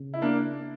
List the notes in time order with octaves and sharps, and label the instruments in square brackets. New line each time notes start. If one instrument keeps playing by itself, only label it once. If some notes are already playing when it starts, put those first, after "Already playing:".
Already playing: [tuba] C#3
[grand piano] E4
A#3 D4